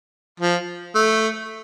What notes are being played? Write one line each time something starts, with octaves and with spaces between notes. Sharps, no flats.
F3
A3